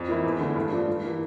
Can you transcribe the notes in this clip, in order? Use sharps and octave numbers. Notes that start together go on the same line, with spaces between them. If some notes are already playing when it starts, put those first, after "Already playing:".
Already playing: F2
E3 A#3 E4
E2
D3 A3 E4
G2
F3 A3 D4
G2
E3 A#3